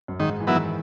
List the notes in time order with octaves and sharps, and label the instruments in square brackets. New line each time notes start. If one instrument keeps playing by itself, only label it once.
[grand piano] F#2
[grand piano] G#2 [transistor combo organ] D#3
[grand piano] E3
[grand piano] D#3 [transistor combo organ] F#3 B3 E4